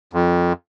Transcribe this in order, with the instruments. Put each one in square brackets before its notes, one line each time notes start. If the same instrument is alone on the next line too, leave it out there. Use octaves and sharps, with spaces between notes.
[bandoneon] F2